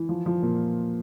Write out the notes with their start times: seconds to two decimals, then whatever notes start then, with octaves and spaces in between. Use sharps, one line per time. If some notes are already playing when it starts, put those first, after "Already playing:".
Already playing: E3
0.09 F3
0.26 F3
0.42 A#2